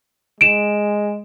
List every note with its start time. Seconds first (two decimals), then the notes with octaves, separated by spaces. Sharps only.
0.41 G#3 D7 E7